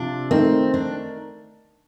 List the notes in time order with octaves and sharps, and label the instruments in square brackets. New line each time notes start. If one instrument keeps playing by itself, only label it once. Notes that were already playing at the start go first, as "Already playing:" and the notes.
Already playing: [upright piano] C3 F3 F4 [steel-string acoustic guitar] D4
[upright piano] D#3 A3 D#4 A#4 [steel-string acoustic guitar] C4
[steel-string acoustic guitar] D4